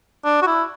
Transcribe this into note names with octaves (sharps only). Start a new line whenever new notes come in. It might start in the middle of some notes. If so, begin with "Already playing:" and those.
D4
F#4
E4